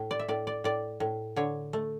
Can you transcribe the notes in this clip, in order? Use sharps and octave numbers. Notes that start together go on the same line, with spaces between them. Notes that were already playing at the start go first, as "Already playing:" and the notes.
Already playing: A2
D5
E5
A2 D5
D5
A2 D5
A2
D3 C#5
A3